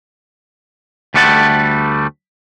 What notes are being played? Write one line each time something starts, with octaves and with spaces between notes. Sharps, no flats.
D2 G3 A3 F#5 A5